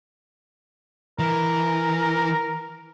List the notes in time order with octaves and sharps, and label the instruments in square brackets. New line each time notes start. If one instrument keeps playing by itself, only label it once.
[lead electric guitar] E3 [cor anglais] A#4